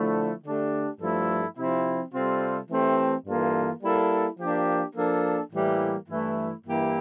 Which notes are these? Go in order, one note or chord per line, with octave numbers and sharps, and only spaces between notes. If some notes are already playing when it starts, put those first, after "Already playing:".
Already playing: D3 F3 A3 E4
D3 A3 D4 G4
G2 F3 A3 E4 A4
C3 F3 C4 E4
C3 G3 C4 F4 A4
E3 A3 C4 G4
G2 E3 A#3 F4 A4
G3 A#3 E4 A4
F3 A#3 D4 G4
F3 A#3 D4 A4
A2 E3 G3 A#3 E4
G2 E3 A3 E4
G2 E3 A#3 E4 G4